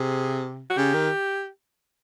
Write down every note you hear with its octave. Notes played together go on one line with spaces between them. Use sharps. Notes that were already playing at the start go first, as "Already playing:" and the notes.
Already playing: C3 G#4
F#4
C#3 G4
D#3